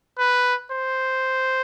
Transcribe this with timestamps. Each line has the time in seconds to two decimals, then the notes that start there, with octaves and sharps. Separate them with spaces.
0.18 B4
0.71 C5